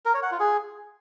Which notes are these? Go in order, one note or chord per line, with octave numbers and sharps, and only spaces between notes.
A#4
C#5
F#5
F4
G#4